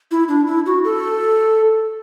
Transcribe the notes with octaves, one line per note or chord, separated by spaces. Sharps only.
E4
D4
E4
F#4
A4